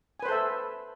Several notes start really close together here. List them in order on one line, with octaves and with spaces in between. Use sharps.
G#5 B4 C5 A4 E5